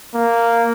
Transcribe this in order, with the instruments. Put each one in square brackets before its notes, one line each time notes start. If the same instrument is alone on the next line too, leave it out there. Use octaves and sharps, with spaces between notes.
[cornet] A#3